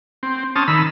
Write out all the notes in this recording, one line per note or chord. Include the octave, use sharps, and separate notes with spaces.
C4
C4 C#4 A5 D#6 F6
D#3 B5 E6